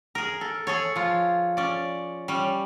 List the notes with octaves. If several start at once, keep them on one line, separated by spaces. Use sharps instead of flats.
G#4 A#4
A4
G#4 A4 C#5
F3 F4
C#4 D5
G3 C#4